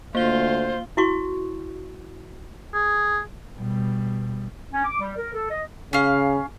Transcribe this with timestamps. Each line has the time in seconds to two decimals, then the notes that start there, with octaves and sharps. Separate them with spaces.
0.15 D2 A#3 F4 C5 G7
0.97 E4 F#4 C#6
2.74 G#4
3.58 B2 G3
4.72 C#4
4.84 D6
5.00 G3
5.17 A#4
5.33 A4
5.50 D#5
5.93 C#3 C#4 F5